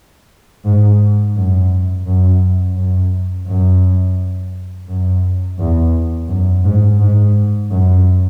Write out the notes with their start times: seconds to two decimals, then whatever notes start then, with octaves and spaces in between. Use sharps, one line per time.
0.65 G#2
1.35 F#2
2.06 F#2
2.76 F#2
3.47 F#2
4.88 F#2
5.59 E2
6.28 F#2
6.64 G#2
6.99 G#2
7.70 F#2